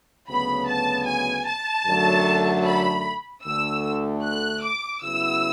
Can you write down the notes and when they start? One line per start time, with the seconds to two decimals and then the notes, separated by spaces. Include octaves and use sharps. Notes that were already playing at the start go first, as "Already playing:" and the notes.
0.29 D2 C#3 F#3 B3 B5
0.68 A5
1.07 G#5
1.48 A5
1.87 F#2 D3 F#3 A3
2.65 B5
3.44 D2 D3 A3 E6
4.24 F#6
4.64 D6
5.03 C#3 F#3 B3 E4 E6